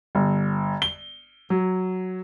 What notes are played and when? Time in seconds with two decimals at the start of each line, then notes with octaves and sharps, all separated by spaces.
0.15 G1
0.82 G7
1.50 F#3